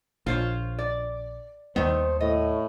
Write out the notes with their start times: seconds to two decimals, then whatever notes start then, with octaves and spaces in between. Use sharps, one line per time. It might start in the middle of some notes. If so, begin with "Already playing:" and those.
0.26 A#1 F4 C5 C#5
0.79 D5
1.76 D#2 D#3 G3 A3 B3 C5
2.20 A2 D#5